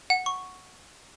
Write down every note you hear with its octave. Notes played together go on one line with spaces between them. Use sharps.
F#5
C#6